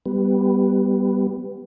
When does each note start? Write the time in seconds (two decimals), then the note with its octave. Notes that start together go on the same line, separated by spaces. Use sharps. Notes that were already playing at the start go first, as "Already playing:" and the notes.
0.06 G3 B3